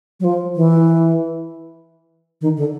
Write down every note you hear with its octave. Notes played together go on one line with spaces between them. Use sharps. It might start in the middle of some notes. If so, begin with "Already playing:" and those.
F#3
F3
E3
D#3
D3